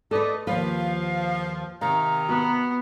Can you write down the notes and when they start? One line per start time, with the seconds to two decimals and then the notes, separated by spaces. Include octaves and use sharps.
0.11 A3 A4 B4 D5 D#5
0.47 D#2 F3 B4 F5
1.81 C3 D#3 F5 A#5
2.29 B3 F#4